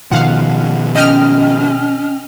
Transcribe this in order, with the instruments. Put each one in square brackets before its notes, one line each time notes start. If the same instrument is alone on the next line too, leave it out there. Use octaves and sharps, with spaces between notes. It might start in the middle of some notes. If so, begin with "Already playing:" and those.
[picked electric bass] B2 D#3 F3 [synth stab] F5 F#5
[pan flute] C#4 [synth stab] D#5 G5 F6